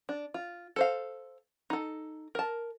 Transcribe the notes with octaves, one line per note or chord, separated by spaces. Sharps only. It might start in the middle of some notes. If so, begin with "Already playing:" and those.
D4
F4
A4 C5 F5
D#4 A4
A#4 A5